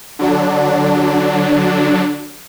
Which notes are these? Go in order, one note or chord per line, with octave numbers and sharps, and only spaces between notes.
D3 F#3 D4